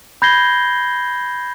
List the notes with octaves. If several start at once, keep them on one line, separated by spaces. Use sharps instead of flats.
B5 G6 G#6 A#6 C7 G7